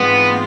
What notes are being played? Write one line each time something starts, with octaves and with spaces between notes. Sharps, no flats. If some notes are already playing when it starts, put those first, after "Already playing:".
Already playing: G#2 E3 G#3 B3 C4 F4